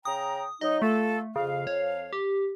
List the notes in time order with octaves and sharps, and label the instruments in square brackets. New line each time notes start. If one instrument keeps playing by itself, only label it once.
[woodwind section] C#3 G5 A#5 [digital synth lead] D#6
[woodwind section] F#3 D#4 [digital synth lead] D#5
[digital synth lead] A3 [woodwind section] F4 A4
[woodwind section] F2 F5 [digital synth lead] C#3
[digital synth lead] C#5
G4